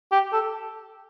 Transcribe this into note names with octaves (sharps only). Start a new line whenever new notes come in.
G4
A4